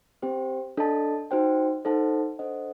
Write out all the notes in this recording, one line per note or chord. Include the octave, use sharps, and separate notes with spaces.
C4 G4 C5 G5
D4 A4 D#5 A5
D#4 F#4 C5 G5
D#4 A4 C5 F#5 A5
D4 A4 C5 D#5 F#5